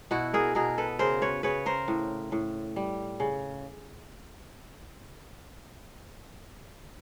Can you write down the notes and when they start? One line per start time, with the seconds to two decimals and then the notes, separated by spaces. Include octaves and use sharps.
0.11 B2 E4 F#4
0.34 G#4 A#4
0.55 B2 G#4 A#4
0.78 A4 B4
0.99 C#3 A#4 C5
1.22 B4 C#5
1.43 C#3 B4 C#5
1.66 A#4 C5
1.88 A2
2.32 A2
2.76 G3
3.20 C#3